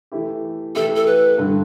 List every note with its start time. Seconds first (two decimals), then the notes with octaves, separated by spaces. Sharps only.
0.12 E3 A3 E4 G4
0.75 E3 A3 E4 G4 A4
0.96 A4
1.06 B4
1.38 G2 D3 G3